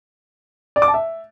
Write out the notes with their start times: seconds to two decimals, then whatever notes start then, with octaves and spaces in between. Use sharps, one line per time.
0.76 D5
0.82 D6
0.88 A5
0.94 E5